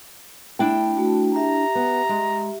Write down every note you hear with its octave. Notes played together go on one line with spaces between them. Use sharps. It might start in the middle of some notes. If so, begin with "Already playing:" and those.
A3 D4 E4 G5
A3 F#4
G4 E5 A#5
B3
G#3